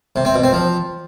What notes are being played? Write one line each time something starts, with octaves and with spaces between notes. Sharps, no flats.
C3
C4
B2
C4
F3